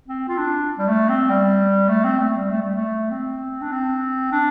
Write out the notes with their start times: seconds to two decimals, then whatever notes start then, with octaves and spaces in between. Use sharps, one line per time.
0.08 C4
0.28 F4
0.38 D4
0.78 G3
0.88 A3
1.09 C4
1.30 G3
1.89 A3
2.04 C4
2.19 A3
2.36 G3
2.50 A3
2.62 G3
2.75 A3
3.11 C4
3.61 D4
3.72 C4
4.32 D4